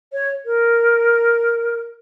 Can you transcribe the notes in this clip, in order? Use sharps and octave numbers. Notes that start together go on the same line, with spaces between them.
C#5
A#4